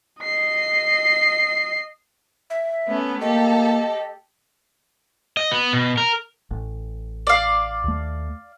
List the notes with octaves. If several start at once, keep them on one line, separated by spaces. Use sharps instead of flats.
D#5 C7
E5
A3 B3 C#4
A#3 G4 A4 D#5
D#5
B3
B2
A#4
A1
D5 F5
D#2 A3